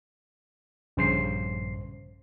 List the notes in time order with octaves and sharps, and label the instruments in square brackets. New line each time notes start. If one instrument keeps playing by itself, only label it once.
[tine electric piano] A#1 C7 [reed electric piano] G2 C#3 C5